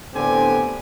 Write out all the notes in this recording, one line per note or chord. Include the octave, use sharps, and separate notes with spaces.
A2 D3 B3 C4 G4 G#5